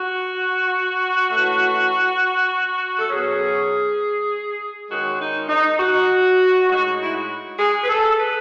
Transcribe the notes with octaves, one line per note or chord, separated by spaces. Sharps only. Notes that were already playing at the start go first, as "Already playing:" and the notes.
Already playing: F#4
E3 A3 C#4
A4
B2 F#3 C#4 G#4
D#3 G#3 C#4 F#4
D#4
D#4
F#4
A2 G#3 D#4 F#4
E4
F#4
G#4
B4
A4
B4